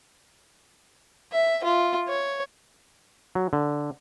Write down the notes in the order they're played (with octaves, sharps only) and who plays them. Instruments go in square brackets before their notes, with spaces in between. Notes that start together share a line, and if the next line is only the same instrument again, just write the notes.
[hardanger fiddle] E5
F4
C#5
[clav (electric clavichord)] F#3
D3